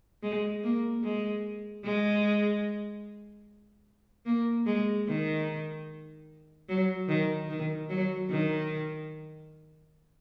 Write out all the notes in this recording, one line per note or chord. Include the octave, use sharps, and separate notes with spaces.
G#3
A#3
G#3
G#3
A#3
G#3
D#3
F#3
D#3
D#3
F#3
D#3